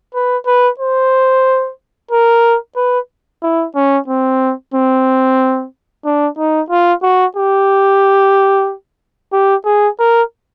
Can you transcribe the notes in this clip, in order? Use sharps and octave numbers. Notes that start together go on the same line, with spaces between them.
B4
B4
C5
A#4
B4
E4
C#4
C4
C4
D4
D#4
F4
F#4
G4
G4
G#4
A#4